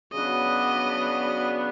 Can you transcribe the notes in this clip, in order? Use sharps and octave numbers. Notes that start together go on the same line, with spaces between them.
C#3 F#3 B3 D4 F#4 D#5